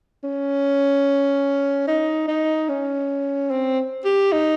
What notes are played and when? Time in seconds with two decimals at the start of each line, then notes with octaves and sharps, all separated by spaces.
0.24 C#4
1.87 D#4
2.28 D#4
2.69 C#4
3.51 C4
4.05 G4
4.32 D#4